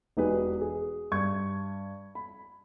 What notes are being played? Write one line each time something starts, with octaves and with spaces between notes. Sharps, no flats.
E1 D#4 G4 G#4 B4
G#4
G2 C#6 G#6
B5